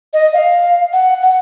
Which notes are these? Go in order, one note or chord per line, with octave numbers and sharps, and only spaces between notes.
D#5
F5
F#5
F#5